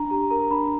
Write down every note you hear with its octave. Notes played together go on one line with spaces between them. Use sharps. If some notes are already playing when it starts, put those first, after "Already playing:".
Already playing: D4 A#5
G4 A#5
A#4 A#5
D4 B5